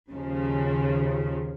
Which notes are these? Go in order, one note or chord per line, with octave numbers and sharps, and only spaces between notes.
D#2 C#3 F3